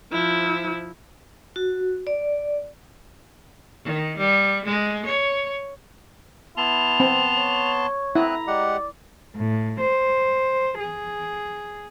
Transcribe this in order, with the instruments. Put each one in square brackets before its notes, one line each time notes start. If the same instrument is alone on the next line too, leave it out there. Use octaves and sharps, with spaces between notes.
[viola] F3 E4
[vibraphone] F#4
D5
[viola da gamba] D#3
G3
G#3
C#5
[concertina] B3 A5 C6 [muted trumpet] E4 [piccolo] F7
[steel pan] C4
[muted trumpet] C#5
[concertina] C4 D#6 F#6 [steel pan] E4 [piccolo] A#5
[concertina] G#3 G4 F#5 [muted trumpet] D5
[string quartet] A2
C5
G#4